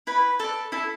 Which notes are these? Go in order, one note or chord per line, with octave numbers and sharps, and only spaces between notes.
E4 B4 B5
A4 B4 D5 A5
E4 A4 A5